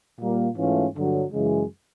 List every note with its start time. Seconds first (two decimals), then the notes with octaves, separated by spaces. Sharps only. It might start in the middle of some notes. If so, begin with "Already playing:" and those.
0.19 A#2 G3 A#3
0.57 G#2 E3 A3 C#4 F4
0.94 G2 D3 F#3
1.33 F#2 C#3 E3 G#3